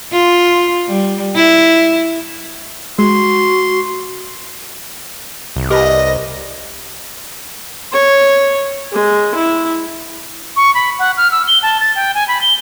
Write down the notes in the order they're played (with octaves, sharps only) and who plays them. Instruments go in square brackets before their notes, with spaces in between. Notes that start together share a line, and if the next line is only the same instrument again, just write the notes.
[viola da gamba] F4
G3
E4
[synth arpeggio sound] G#3 [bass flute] F#4 [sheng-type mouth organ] C6
[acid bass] C2
[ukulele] G4 A#4 B4 [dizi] D#5
[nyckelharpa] C#5
G#3
E4
[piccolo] C#6
B5
F#5
F6
E6
G7
A5
A6
G5
G#5
B5
G7